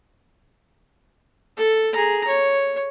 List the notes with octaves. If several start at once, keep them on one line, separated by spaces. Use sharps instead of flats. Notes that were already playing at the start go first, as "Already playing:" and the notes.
A4
G#4 A#5
C#5